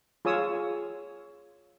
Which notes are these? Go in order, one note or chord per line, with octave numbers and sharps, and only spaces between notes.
F4 G#4 C#5 D#6 E6